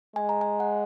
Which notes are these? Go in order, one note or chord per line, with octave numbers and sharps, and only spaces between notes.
G#3 G#5
A#5
G#5
F#5